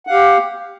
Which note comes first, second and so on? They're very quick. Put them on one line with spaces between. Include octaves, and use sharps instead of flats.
F#5 F5 G4